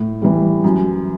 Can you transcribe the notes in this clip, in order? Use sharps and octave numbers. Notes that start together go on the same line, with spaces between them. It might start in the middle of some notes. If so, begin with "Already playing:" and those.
Already playing: A2
E3 G3
F#2